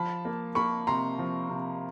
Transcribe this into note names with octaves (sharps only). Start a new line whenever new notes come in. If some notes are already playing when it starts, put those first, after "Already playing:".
Already playing: F3 A5 B5
A#3
A#3 B5 C#6
C3 A#5 C6
F3
C3